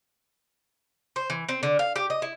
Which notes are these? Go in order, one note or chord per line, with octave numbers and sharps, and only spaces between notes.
C5
E3
C4
D3
F5
G4
D#5
E4